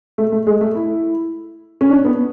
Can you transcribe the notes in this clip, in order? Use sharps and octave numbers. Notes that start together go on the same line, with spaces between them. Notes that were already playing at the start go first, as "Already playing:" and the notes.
A3
A3
G#3
A3
E4
C#4
D4
B3